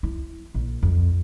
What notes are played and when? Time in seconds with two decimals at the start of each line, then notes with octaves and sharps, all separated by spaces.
0.03 E4
0.54 A#1
0.83 F2